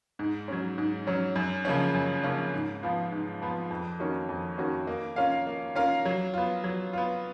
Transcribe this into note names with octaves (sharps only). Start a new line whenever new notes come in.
G#2
F#3 C#4
G#2
F#3 C#4
F#2
C#3 F3 A#3 C#4
F#2
C#3 F3 A#3 C#4
G#2
F3 B3 F4
G#2
F3 B3 F4
F2
D#3 A#3 C#4 F#4
F2
D#3 A#3 C#4 F#4
A#3
C#4 F4 A#4 F5
A#3
C#4 F4 A#4 F5
F#3
B3 F4
F#3
B3 F4